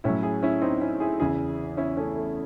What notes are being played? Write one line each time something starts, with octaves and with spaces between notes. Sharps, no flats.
A2 F#3 C#4 E4
E4 G#4
C#4 E4
C4 D#4
C#4 E4
E4 G#4
E2 C#3 E3 E4 G#4
C#4 E4
A3 C#4
A3